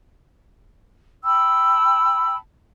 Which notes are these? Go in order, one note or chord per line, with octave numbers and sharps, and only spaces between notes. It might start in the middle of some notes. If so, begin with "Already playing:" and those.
G5 A5 B5 E6